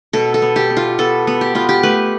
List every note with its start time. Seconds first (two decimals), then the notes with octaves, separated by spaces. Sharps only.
0.13 B2 A4
0.34 A4
0.42 B3
0.56 G4
0.70 B3
0.77 F4
0.98 B3 A4
1.27 B3
1.41 G4
1.55 B3 F4
1.69 G4
1.83 A3 B4